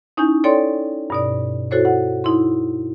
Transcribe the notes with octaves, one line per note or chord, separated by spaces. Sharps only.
C#4 D#4 E4 G#5 G6
A4 C#5 D5 G5 C6
G2 B2 D5
E4 F#4 A4 C5 C#5
F#5
D#4 E4 C6